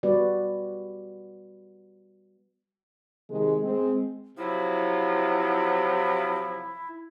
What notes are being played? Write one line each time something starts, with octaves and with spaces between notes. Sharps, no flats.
G3 B3 F#4 B4 D5
C3 D#3 G#3
G#3 C4
C3 F3 F#3 E4